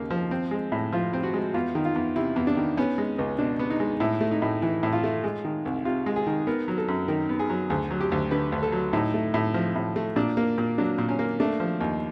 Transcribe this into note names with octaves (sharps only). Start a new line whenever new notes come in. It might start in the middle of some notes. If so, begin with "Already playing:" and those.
Already playing: D#2 C#3 A#3
F3
C4
G#3
A2
F3 F4
C4
F#4
G#3
E2 F4
D#3
F4
E2
C3 E4
E2
D4
D#3
B3 C#4
G#3
C#2
B2 D4
B3
D#4
G#3
A2 E4
A3
D#4
A2
E3 E4
A2
F4
A3
G#3
D#3
C2
C3 F4
G#3
G#4
D#3
B3 A#4
F#3
A4
F#2
D#3 A#4
B3
G#4
F#3
D2 G#4
F#3
G4
D2
D3 B4
D2
A4
F#3
A2 D#4
A3
A2
F3
A2
A3
A#2 D4
A#3
A#2
F#3 D4
A#2
C#4
A#3
A3 D4
F3
D#2